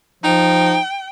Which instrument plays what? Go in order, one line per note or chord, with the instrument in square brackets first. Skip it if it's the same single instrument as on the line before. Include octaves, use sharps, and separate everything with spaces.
[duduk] F3 [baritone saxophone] D#4 [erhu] G5